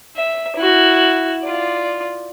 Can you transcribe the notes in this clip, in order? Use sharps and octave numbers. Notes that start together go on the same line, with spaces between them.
E5
E4 F#4
F4 D5